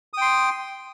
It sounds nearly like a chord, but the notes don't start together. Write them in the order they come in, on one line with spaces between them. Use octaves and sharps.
D#6 G5 C6